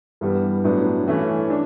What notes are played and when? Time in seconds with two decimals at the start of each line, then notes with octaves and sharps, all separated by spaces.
0.21 G2 E3 G3 B3
0.64 A2 F#3 B3 D4
1.08 E3 A3 C#4
1.50 D4